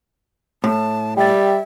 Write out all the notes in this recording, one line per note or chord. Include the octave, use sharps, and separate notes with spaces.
A2 A5
G3 E5 G5 A6